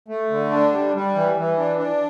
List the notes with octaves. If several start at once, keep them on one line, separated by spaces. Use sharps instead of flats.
A3
D3
D4
G3
G3
E3
E3
D4
D4